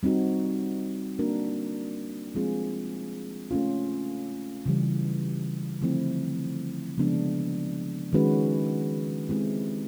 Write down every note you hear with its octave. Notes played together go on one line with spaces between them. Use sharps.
G3 C4 D#4 F#4
A#3 D4 F#4 A#4
F3 G#3 C4 F4 G#4
A3 C#4 F4
C#3 E3 G3
D3 F3 A3 C4 E4
C#3 F3 G#3 B3 D4
D#3 G#3 C#4 F#4 B4
G#3 C4 E4 G4